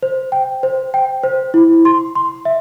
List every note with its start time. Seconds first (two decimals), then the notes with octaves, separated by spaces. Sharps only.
0.03 C5
0.32 G5
0.63 C5
0.94 G5
1.23 C5
1.54 E4
1.85 C6
2.15 C6
2.45 E5